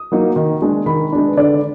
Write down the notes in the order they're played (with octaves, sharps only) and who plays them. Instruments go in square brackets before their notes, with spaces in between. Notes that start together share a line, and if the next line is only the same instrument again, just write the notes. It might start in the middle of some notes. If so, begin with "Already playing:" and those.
Already playing: [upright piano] D#6
F#3 A#3 D#4
D#3
G#3 D4
D#3 B5
G#3 D4
B4
D3 D5